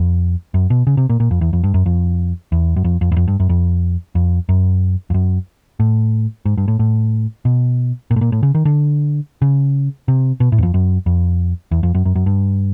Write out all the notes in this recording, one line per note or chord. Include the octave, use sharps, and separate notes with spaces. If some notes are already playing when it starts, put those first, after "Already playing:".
Already playing: F2
F#2
B2
C#3
C3
A#2
A#2
F2
E2
F2
G2
F#2
F2
E2
F#2
F2
F2
E2
F2
G2
F#2
F2
F2
F#2
F2
F#2
A2
G#2
G2
A2
A2
B2
A#2
A2
A#2
A2
C#3
D#3
D3
C#3
C3
B2
A2
E2
F2
F#2
F2
E2
F2
F#2
F#2
F#2
G2